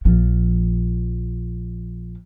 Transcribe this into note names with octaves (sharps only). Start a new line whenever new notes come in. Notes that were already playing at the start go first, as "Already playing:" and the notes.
A#1 F3